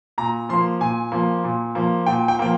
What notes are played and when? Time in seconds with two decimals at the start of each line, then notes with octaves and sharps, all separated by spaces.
0.18 A#2 A#5
0.49 F3 A#3 C6
0.80 A#2 G#5
1.12 F3 A#3
1.44 A#2
1.75 F3 A#3
2.06 A#2 G5
2.28 G5
2.39 F3 A#3 G5